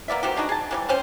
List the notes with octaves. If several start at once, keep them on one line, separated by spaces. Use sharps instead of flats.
A#3 B3 D5 E5
D#3 C4 F#4 G4
G#3 D4 D#4 F#4
G#4 A5
E3 F#3 G3
C4 C#4 C5